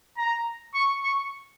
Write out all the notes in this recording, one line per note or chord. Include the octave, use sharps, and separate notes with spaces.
A#5
C#6
C#6